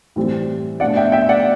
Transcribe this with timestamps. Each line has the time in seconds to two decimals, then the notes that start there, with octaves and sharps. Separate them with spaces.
0.16 A2 E3 G3 C4
0.80 B2 A3 D4 D5 F#5
0.96 E5 G5
1.12 E5 G5
1.29 D5 F#5